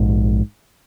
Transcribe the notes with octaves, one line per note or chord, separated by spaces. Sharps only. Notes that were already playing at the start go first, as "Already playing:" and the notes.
Already playing: A#1 G#2